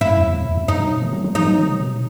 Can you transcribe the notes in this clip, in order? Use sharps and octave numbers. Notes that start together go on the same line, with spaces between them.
F#2 E4
E2
F#2
E2
E2
F#2
G2 D#4
B2
D#3
F#3
F#3
E3 D#4
F#3
D#3
C3
B2